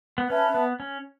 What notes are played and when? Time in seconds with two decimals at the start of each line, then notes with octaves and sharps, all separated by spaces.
0.18 B3
0.29 C#4 B4 E5 A5
0.55 B3
0.80 C#4